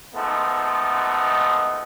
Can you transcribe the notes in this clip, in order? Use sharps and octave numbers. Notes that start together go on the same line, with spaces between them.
F3 G#3 A3 B3 D#4